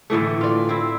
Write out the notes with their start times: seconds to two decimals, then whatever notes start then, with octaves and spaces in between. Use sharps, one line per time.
0.10 A2 D3 E3 A3
0.41 F4 D5
0.69 C4 E4